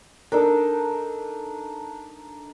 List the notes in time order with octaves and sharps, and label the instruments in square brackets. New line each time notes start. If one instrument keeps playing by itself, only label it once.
[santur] D4 D#4 A4 [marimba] A#4 D5